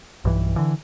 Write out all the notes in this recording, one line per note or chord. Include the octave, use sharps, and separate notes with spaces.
B1 G2 E3
D3 E3